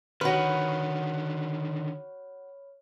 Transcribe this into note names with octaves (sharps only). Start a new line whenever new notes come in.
D3 D#3 F#4 B4 C#5 B5 F6